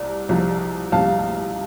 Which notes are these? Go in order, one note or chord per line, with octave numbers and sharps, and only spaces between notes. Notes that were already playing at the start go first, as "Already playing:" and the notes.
Already playing: C2 C3 D5
C2 C3 F3
C2 C3 F3 F5 A5